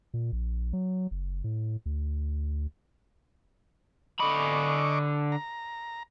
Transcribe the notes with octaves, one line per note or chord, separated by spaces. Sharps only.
A#2
A#1
F#3
F#1
A2
D2
D3 D#5 B5 C#6 D6
A#5